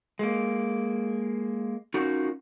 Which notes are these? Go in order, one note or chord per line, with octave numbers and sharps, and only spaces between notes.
G#3 A#3
C#4 D#4 F4 F#4 A#4